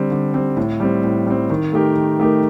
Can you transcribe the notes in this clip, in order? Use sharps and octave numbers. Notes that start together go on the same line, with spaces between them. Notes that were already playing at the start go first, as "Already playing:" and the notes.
Already playing: D3 G3 C4
D3
G3 C4
A2
G3 C4
A2
G3 C4
D#3
A3 D#4 G4 A#4
D#3
A3 D#4 G4 A#4